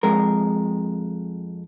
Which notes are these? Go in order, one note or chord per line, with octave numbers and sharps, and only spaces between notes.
F2 G#3 A#4